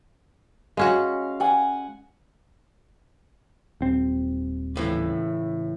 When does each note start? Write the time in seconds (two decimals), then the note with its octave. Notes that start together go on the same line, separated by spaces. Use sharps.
0.77 G#3 C#4 F#4 F5
1.40 F#5 G#5
3.81 D#1 C4
4.76 C#2 A2 E3